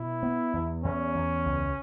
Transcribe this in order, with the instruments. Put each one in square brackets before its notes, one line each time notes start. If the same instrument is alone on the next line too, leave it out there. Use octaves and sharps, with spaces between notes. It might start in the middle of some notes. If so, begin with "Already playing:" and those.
Already playing: [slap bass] B2 [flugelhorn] E4
[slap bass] B3
E2
[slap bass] E2 [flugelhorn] C#4
[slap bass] E2
C#2